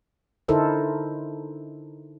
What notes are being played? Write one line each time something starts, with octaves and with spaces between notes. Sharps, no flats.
D3 D#4 E4 A4 A#4 C5